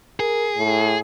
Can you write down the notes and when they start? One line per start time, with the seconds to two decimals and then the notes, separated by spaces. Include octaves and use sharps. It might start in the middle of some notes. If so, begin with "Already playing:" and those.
0.20 G#4 A#4
0.57 A2